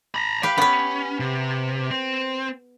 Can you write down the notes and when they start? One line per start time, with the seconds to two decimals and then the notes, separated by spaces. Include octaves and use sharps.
0.15 A#5 B5
0.43 G4 B4 F5
0.58 B3 C#4 B4
1.20 C3
1.91 C4